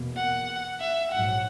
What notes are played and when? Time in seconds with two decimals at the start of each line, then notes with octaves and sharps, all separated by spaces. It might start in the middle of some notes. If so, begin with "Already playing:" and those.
Already playing: E2 B2 A#3
0.16 F#5
0.80 E5
1.11 A#1 G#2 F#3 F#5